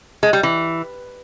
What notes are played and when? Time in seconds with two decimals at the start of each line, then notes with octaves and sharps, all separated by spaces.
0.23 G#3
0.33 G3
0.43 E3